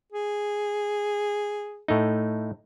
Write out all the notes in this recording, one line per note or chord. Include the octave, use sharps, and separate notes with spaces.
G#4
A2 A3 D#4